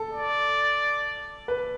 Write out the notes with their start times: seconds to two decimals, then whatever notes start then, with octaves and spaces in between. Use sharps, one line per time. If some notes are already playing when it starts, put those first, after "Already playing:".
Already playing: A4
0.12 D5
1.48 B4